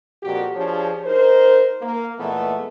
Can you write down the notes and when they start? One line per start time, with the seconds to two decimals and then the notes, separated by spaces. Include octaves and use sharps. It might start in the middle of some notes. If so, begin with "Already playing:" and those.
0.23 F2 A#2 F#4 G4
0.55 F3 D4 G4 G#4 C#5
1.05 D#4 A#4 C5
1.81 A#3
2.18 A#2 E3 G#3 A3 B3